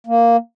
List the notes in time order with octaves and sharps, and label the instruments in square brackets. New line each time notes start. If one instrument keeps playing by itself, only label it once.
[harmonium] A#3